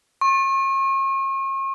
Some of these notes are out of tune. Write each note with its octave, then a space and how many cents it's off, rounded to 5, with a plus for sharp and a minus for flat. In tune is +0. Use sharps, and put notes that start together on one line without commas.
C#6 -40